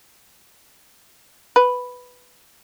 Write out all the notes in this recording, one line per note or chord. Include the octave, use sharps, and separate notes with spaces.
B4